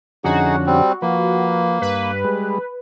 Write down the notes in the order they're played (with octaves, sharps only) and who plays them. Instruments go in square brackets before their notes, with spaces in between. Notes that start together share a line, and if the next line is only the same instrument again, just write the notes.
[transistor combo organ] F2 D3 C#4 [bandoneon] D#4 G#4 F#5 [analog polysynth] F#4
[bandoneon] G3 C4
[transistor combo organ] F3 B4 [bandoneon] A#3
[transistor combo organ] G2 [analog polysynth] B4
[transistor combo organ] G3 G#3